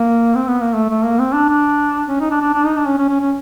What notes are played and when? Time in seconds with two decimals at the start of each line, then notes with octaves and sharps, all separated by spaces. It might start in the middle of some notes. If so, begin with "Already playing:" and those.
Already playing: A#3
0.35 C4
0.48 B3
0.61 A#3
0.74 A3
0.90 A3
1.05 A#3
1.19 C4
1.33 D4
1.49 D4
2.09 C#4
2.20 D#4
2.31 D4
2.42 D4
2.53 D4
2.65 D#4
2.76 D4
2.86 C#4
2.98 C#4
3.10 C#4
3.21 C#4